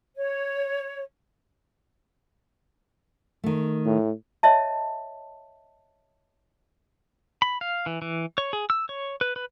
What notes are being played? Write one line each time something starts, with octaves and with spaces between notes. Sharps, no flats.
C#5
D#3 A3
A2
C#5 D#5 E5 A5
B5
F5
E3
E3
C#5
G#4
E6
C#5
B4
B4